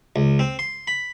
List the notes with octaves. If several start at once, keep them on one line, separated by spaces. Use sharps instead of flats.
C#2
C4
C6
B5